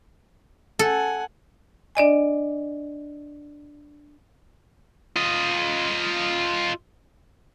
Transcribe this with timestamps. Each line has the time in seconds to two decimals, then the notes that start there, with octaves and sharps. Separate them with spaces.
0.79 A4 F#5 G#5
1.95 D4 D5 D#5 G#5
5.16 F4 D#5